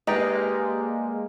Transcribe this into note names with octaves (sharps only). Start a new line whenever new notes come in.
G#3 A#3 D#4 G4 B4 D5 G5 A#5